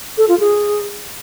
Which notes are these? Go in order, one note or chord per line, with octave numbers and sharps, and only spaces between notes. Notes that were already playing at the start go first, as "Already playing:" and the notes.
A4
F4
G#4